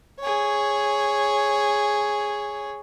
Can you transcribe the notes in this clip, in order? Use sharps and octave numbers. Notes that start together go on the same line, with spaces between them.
G#4 C#5